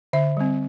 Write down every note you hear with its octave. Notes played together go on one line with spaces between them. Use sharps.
D3 E5
G3 C4